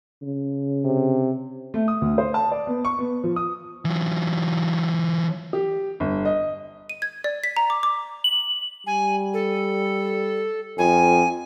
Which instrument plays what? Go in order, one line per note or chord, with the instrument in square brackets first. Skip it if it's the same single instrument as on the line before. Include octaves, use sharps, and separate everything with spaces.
[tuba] C#3
[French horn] C3
[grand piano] A3
D#6
D2
C5
A5
D5
B3
C#6
B3
F3
D#6
[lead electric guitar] E3 F#3
[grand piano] G4
G1
D#5
[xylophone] D#7
G#6
D5
B6
A#5
D6
D6
[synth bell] F#7
[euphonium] G3 [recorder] G#5
[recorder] A4
[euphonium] F2 [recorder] G#5